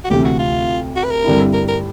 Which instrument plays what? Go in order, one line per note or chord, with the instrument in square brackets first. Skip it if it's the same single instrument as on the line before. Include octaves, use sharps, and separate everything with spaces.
[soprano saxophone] F#4
[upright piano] D2 C3 E3 [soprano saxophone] G4
[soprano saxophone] F#4
F4
F#4
B4
A#4
[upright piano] G2 D3 G3 C4 E4
[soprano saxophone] A#4
A#4